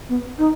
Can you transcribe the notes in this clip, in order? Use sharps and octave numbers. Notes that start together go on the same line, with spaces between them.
B3
D#4